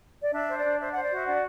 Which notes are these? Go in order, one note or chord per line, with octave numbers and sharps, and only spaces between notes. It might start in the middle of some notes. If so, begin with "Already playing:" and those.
D5
D4 E5
C5
D5
D4
C5 E5
C5 D5 F#5
D5
F#4 E5
D4 D5 F#5